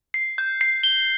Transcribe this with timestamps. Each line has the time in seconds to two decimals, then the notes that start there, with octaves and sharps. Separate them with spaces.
0.14 C7
0.38 G6
0.61 C7
0.83 G7